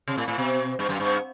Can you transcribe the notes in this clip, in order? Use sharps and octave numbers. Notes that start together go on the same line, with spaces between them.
C3
A2
A2
B2
G2
F#2
G2